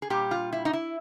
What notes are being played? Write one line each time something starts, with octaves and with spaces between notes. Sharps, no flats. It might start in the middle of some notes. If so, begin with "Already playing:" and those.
G#4
A#2 G3 G4
F4
E4
D#4
E4